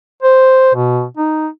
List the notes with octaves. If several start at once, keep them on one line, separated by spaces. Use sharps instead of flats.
C5
B2
D#4